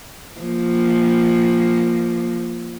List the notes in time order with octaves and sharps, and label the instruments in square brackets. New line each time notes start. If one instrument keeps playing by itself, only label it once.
[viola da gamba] F3 A#3